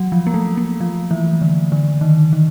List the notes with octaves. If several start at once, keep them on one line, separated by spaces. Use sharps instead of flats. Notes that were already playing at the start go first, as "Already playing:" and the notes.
Already playing: F#3
F3
A#3
A3
A#3
F3
E3
D3
D3
D#3
D#3